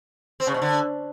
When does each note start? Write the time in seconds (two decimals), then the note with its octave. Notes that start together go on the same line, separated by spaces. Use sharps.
0.40 C4
0.47 C#3
0.54 B2
0.62 D3